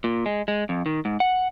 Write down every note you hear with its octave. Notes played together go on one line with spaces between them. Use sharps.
A#2
G#3
G#3
F2
D#3
G#2
F#5